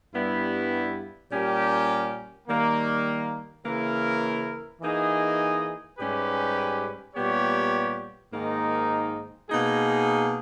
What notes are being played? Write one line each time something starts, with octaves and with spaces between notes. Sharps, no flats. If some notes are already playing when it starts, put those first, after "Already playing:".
G2 G3 B3 E4
A#2 G3 C#4 G4 A#4
D#3 G3 A#3
C#3 E3 A#3 E4 A#4
E3 A#3 D#4 G#4 D#5
G#2 G3 C#4 G4 B4
A#2 G3 B3 G4 C#5
G#2 D#3 A#3 D#4
B2 A#3 D#4 G#4